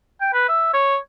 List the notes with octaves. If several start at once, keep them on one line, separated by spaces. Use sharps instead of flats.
G5
B4
E5
C#5